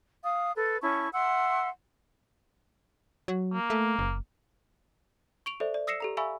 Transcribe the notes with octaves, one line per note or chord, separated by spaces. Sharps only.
F5 D#6
A4 B4
C#4 E4 A5 C#6
E5 F#5 C6 E6
F#3
A#3
A3
F#1
C#6 D7 F7
A4 C5 D5 E5
D5
D#6 E6 A#6 C7 C#7 E7
G4 A4 A#5
E5 F5 G#5 B5 C#6 E6